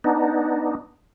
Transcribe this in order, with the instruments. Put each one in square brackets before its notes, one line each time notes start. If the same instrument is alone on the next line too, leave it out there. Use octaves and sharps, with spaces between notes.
[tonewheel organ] B3 D4 D#4